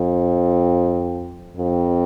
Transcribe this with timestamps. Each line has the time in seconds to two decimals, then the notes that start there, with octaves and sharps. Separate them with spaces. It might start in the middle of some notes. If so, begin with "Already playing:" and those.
Already playing: F2
1.57 F2